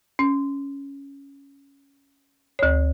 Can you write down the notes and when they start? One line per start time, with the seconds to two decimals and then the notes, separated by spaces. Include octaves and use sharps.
0.19 C#4
2.59 D2 C#5